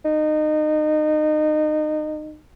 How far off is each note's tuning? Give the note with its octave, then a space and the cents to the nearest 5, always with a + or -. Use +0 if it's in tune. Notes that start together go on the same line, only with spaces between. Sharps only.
D#4 -25